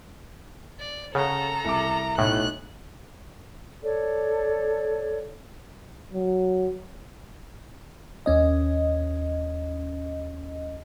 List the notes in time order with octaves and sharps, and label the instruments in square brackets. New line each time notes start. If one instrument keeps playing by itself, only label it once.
[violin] D5
[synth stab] C#3 [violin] A4 A#5 [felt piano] F#5
[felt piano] C2 D6
[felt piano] B1 [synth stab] A2 [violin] F#6
[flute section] A4 C#5 D5
[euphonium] F#3
[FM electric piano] D#2 C#4 D#5